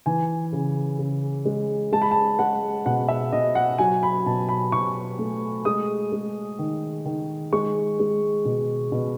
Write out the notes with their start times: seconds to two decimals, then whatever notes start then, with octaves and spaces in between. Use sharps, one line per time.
0.06 E3 G#5
0.52 C#3
0.99 C#3
1.45 G#3
1.92 G#3 A5
2.02 B5
2.11 A5
2.39 G#3 F#5
2.86 B2 F#5
3.08 E5
3.32 B2 D#5
3.55 F#5
3.78 F#3 G#5
4.03 B5
4.26 B2 A5
4.49 B5
4.72 B2 C#6
5.19 A3
5.65 G#3 D#6
6.12 G#3
6.59 D#3
7.05 D#3
7.52 G#3 C#6
7.99 G#3
8.45 B2
8.92 B2